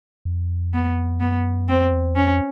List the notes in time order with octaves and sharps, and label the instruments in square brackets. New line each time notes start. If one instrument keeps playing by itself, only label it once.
[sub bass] F2
[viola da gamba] B3
[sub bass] F#2 [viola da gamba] B3
[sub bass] F2 [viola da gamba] C4
[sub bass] E2
[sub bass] F2 [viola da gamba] C#4